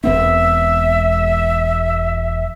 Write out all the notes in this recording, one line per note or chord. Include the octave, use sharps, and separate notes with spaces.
E1 B3 C4 E5